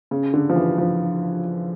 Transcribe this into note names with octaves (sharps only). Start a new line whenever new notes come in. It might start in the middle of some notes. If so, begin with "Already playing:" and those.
C#3
D3
F3
E3
F3